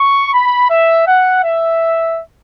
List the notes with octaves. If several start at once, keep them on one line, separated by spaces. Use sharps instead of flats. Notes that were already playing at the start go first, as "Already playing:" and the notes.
Already playing: C#6
B5
E5
F#5
E5